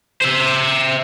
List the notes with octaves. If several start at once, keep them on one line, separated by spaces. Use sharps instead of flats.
C5 E5